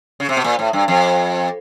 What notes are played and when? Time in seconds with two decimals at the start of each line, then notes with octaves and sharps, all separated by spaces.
0.20 C#3
0.29 C3
0.37 B2
0.44 A#2
0.59 A2
0.73 G2
0.88 F2